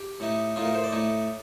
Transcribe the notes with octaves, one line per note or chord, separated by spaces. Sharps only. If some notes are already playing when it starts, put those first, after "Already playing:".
Already playing: G4
A2 A3 D#4
A2 A3 D#4 F4
A#4
C5
D5
A2 A3 D#4